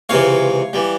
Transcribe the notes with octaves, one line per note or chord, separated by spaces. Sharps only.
C#2 C3 E3 C#5 F5
E3 G3